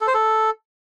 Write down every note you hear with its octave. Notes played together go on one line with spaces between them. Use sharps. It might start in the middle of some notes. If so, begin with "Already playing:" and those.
A4
C5
A4